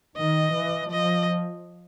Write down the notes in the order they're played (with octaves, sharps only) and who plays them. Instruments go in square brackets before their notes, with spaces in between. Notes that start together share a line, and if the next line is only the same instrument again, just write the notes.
[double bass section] D#3 [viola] D#5
[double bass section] E3
[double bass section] F3 [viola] D#5